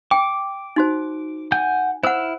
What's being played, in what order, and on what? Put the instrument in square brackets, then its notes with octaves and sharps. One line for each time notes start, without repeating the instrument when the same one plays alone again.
[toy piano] G5 [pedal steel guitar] D6
[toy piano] D#4 F#4 C5
[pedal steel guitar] F#5 G#5 G6
[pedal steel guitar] E4 E6 F6 [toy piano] C5 F#5